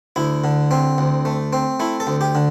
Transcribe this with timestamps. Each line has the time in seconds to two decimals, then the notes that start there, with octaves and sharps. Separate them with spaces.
0.16 D2 E4
0.44 D3
0.71 C4
0.98 D2
1.25 A3
1.53 C4
1.80 A3 E4
2.00 A4
2.07 D2
2.21 G4
2.35 D3